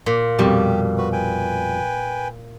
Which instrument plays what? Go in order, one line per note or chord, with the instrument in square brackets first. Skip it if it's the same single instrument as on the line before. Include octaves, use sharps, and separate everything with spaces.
[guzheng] A#2
[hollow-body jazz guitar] F2 B2 G3 [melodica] G4
[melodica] F#4 B4
B4 G5 G#5